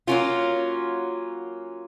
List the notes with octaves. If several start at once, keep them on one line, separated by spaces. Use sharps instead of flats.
F#3 A#3 C#4 F4